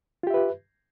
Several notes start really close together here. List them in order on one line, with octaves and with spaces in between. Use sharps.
F4 G4 E5 B4